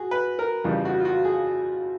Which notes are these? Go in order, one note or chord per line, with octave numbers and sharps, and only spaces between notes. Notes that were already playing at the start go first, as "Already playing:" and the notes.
Already playing: F#4 G#4
B4
A#4
F2 C#3 E3 G3
F#4
F4
F#4
G#4